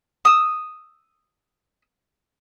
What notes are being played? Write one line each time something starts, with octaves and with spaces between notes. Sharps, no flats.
D#6 E6